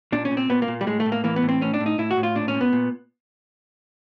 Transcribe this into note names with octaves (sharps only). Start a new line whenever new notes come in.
A#2 D4
C#4
A#2
C4
A#2 B3
A#3
A#2
G3
A2 G#3
A3
A2
A#3
E3 A#3
B3
A2
C4
A2 C#4
D4
A2
D#4
A2 E4
F#4
A2
F4
A#2 D4
C#4
A#2
B3
A#2